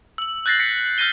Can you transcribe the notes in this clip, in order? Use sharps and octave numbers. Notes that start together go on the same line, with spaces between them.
E6 F#7
F#6 G6 A6 A#6 C7 F#7
A#6 B6 C#7
F6 G6 A#6 D#7 G7